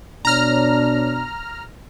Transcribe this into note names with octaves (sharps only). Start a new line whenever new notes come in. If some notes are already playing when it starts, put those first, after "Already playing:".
B2 D4 C#5 A#5 F6